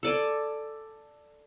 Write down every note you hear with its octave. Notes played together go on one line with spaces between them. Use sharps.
A4 D5 G#5